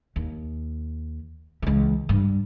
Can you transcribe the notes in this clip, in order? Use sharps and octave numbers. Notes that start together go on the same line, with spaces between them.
D#2
C#2 E3
G2